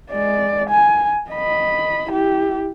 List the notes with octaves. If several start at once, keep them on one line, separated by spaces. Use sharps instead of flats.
G#3 D5
G#5
D#5 B5
E4 G4